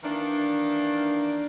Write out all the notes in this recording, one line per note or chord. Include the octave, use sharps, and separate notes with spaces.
D#3 E3 A#3 D4